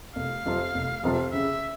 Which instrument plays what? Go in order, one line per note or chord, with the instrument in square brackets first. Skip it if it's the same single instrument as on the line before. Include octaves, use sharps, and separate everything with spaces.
[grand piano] F1 [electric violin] F5
[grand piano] F2 C3 F3
F1
F2 C3 F3
[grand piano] C#3 [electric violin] E5